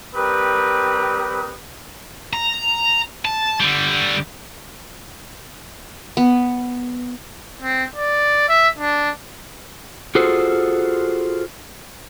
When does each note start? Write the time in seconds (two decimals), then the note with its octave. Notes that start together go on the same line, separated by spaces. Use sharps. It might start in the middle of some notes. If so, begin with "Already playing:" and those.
0.14 G3 C4 G4 A#4 B4 D#6
2.33 A#5
3.25 A5
3.60 D3 G3
6.17 B3
7.62 C4
7.96 D5
8.49 E5
8.78 D4
10.15 F4 F#4 G#4 A4 C5